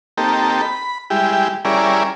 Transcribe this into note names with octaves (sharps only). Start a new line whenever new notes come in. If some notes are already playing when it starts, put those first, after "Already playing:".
A#3 C4 D#4 G4 A4
B5
G3 G#3 E4 G4
G3 C#4 E4 G#4 A#4 D5